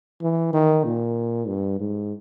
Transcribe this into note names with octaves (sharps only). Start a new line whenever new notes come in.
E3
D#3
A#2
G2
G#2